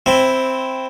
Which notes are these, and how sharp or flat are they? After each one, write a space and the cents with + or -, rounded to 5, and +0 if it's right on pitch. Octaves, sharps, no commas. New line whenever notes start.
C4 +0 E4 +0